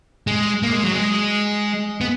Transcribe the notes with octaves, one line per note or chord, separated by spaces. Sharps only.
G#3
A#3
G#3
F#3
G#3
B3